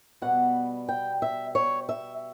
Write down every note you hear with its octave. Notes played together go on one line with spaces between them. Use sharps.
B2 G3 B3 F#5
G5
E5
C#5
E5